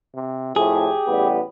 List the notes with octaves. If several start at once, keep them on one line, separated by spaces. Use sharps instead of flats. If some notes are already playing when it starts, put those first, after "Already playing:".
C3
F2 A2 G4 G#4
A1 G3 B3